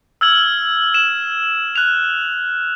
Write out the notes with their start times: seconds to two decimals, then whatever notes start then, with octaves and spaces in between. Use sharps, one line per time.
0.21 E6 F6 G#6 F#7
0.94 E7
1.76 F6 F#6 F7